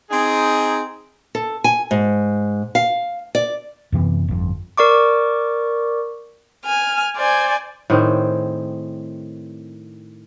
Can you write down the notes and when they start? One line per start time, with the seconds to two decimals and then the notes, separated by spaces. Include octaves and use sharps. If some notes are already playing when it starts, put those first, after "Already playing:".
0.10 C4 D#4 G#4
1.35 A4
1.64 G#5
1.91 G#2
2.75 F5
3.35 D5
3.92 F#2 C3 E3 B3
4.28 G1 F2
4.78 A#4 D5 C#6 D6
6.65 G#5 F6
7.17 C5 D5 G#5
7.90 A2 D#3 C4 G#4